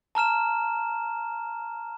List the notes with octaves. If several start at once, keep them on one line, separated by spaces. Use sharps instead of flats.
A5 A#5 F6 E7